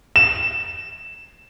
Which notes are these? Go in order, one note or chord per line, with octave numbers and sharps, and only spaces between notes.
E7